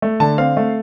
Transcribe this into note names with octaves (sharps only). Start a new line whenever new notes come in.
A3
D3 A5
C4 F5
A3